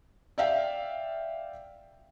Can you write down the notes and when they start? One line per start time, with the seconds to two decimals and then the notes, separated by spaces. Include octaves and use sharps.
0.38 D5 E5 F5 G5